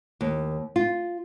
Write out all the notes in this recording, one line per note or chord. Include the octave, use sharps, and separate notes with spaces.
D#2
F4